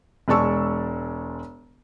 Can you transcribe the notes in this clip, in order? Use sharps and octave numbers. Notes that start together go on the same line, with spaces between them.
E1 G#3 D5 A5 C#6 E6